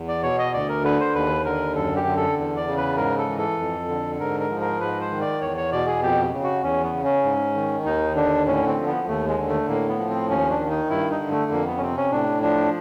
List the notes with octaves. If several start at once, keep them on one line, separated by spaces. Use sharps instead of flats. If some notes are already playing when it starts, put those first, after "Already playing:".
Already playing: E2
D5
B2 C#5
D#5
D2 D5
A#4
D3 B4
C5
D#2 B4
D3 A#4
F#2 A4
G4
D3
A4
E2
D5
C#3
B4
G#2 A#4
A4
E3
A4
F2
D3
G#2 A#4
A#4
F3
A#4
G#2 B4
C5
D#3
D5
E2 C#5
C#5
B2 D5
G#4
F2 G4
C#3
F#4
E2 C#4
B3
C#3
C#4
G#2
D#3
D#2 D#4
D3 D4
A2 C#4
C4
F3
B3
D#2 A3
G#3
D3
A3
A2 A#3
B3
F3
C4
D#2 C#4
D4
D#3
D#4
G2 E4
D#4
D3
A3
F2 A#3
B3
C#4
C3 C4
C#4
A2 D4
F3 D4